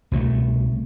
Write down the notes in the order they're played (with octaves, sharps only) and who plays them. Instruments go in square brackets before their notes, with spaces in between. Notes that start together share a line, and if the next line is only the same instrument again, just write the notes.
[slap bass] C2 B2 F3 A3